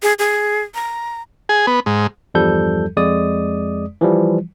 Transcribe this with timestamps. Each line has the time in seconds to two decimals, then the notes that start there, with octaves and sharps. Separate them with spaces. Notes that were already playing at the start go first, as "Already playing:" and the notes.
0.03 G#4
0.19 G#4
0.75 A#5
1.49 G#4
1.67 B3
1.86 G#2
2.34 E2 G2 F3 G3 A4 G6
2.97 F2 G#3 D5 D#6
4.01 E3 F3 G3